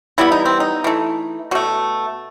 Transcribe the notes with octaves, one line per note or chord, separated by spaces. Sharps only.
E3 G3 B3 E4
D#4
C4
D#4
E3 A3
B2 A3 F#4